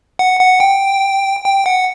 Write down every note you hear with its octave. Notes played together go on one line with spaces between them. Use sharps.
F#5
F#5
G5
G5
F#5